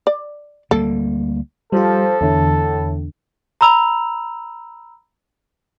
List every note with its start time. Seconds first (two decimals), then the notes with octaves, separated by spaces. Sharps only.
0.07 D5
0.71 D2 G3 A#3 A4
1.72 F3 G3 G4 A4
2.21 E2 A2 D3
3.61 A#5 B5 E6 F7